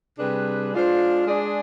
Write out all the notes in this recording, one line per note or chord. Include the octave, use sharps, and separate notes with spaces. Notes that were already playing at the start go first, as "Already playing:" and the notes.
C3 G3 D4 G#4 B4
G#3 D4 F4 C5
G#3 D4 G#4 D5